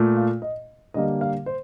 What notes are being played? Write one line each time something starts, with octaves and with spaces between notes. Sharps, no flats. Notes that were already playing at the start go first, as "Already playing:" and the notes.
Already playing: A#2 A3
F4
D#5
D3 G3 A#3 D#5
F5
C5